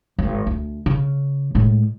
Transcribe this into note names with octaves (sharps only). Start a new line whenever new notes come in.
G#1
D2
C#3
A2 G#3